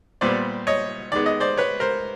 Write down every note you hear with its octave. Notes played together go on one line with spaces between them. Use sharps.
A#2 G3 B3 C5 D5
C#5 D#5
D#3 G#3 B3 D5
D#5
C5 D5
B4 C#5
A#4 C5